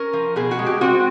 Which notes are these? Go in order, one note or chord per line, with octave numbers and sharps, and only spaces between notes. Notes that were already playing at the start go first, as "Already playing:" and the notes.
Already playing: C#4 A#4
F3
B2 G#4
F#4
G#3
G4
C4 F#4